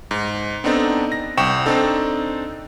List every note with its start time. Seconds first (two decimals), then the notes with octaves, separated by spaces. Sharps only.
0.11 G#2
0.64 B3 C4 D4 D#4 A4
1.12 A#6
1.37 C2 G5 C#6 E7
1.66 C4 D4 D#4 A4